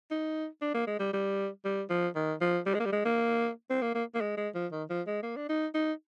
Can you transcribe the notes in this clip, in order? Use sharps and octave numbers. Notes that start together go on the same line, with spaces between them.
D#4
D4
A#3
G#3
G3
G3
G3
F3
D#3
F3
G3
G#3
A#3
G3
G#3
A#3
C4
A#3
A#3
A#3
G#3
G#3
F3
D#3
F3
G#3
A#3
D4
D#4
D#4